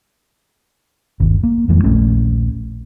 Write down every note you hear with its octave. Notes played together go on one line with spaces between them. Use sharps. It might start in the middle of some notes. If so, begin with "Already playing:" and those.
G1 D#2
A#3
D#1 F2 E3 G#3
D#1 A#1 A3 C#4